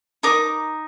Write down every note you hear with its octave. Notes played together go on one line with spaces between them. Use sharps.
D#4 A#4 D#5 D6